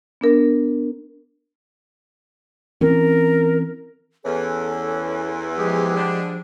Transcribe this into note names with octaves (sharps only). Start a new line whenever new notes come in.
B3 D4 A#4
E3 C4 C#4 A#4
E2 E3 C#4 A4
F3 G#3 G4 G#4
D3 G3 D4